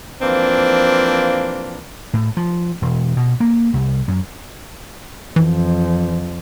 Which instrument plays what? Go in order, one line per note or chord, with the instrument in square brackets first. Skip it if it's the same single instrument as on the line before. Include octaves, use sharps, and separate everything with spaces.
[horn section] E3 F3 A#3 C4 D4
[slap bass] A2
F3
E1
B2
A#3
C2
F#2
[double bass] F2 [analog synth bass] E3